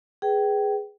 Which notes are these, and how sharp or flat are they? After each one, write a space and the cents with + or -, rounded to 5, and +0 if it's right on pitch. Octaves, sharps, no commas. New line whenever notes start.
G#4 +0 B4 +0 G5 -20